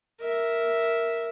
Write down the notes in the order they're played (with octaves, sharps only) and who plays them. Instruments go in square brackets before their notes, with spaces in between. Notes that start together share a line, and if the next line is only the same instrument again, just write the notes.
[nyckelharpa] A#4 E5